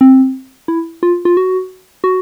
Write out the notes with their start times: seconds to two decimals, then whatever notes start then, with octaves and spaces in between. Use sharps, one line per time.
0.01 C4
0.68 E4
1.03 F4
1.25 F4
1.37 F#4
2.04 F#4